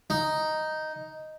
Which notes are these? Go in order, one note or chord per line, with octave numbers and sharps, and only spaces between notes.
D#4